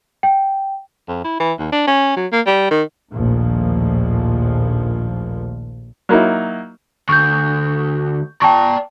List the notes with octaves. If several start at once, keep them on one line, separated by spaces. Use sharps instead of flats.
G5
F2
E4
E3
D#2
D4
C#4
F#3
A#3
G3
D#3
A#1 D#2 A2 F3
F#3 A#3 D#4 E4
D2 C#6 G6
D5 G5 A5 A#5 C#6